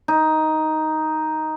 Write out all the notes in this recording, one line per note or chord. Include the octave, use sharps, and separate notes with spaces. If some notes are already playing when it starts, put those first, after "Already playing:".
D#4